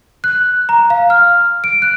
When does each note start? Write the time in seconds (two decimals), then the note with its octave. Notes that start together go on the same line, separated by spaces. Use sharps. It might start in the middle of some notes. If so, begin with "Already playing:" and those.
0.24 F#6
0.69 A#5
0.90 F5
1.10 F6
1.64 D7
1.82 F#6